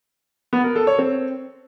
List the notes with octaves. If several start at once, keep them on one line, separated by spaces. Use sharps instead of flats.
B3
A#4
A4
C#5
C4